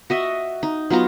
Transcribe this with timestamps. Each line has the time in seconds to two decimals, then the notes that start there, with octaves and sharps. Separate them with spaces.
0.10 F#4 D#5 E5
0.63 D#4
0.90 F#3 B3 F4 A#5